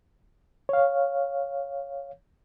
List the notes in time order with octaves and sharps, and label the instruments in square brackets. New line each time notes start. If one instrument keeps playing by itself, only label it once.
[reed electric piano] C#5 F5